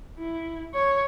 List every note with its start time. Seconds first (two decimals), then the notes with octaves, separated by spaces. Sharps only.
0.18 E4
0.74 C#5